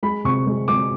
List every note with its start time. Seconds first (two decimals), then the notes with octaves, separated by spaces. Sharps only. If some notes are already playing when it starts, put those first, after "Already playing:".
0.03 G#3 B5
0.25 C3 C#6
0.47 G#3
0.68 G#3 D6